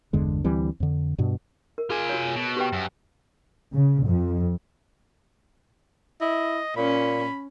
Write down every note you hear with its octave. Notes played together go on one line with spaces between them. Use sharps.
G1 E2 D3 G#3
D2 E3 G3 C4
F2 D3
G2 B2
A#4
F4 G#4 G#5
F#4 C#5
B2
G4 B4 G5
F#2
C#3
F2
E4 D#5
A#2 C#4 B5